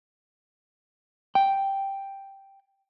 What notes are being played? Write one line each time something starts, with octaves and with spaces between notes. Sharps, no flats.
G5